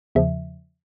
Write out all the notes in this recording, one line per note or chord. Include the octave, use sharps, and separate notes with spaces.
E2 C#3 F3 E5